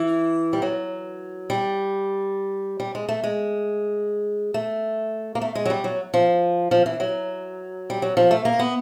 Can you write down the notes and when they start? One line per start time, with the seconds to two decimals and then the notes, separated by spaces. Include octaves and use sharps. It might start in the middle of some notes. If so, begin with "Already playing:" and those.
Already playing: E3
0.53 G3
0.62 F#3
1.50 G3
2.80 G3
2.95 G#3
3.09 A3
3.24 G#3
4.54 A3
5.35 A#3
5.42 A3
5.55 G#3
5.65 F#3
5.70 G3
5.84 F#3
6.14 F3
6.71 F3
6.86 E3
7.00 F#3
7.90 G3
8.02 F#3
8.17 F3
8.31 A3
8.45 A#3
8.59 B3